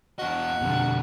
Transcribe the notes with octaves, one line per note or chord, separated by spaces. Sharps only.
E2 F#4 D#5
F2 B2 D3 G3